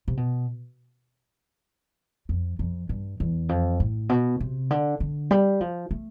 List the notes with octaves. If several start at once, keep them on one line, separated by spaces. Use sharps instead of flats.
C3
B2
F2
F2
G2
E2
F2
A2
B2
C3
D3
D3
G3
F3
A3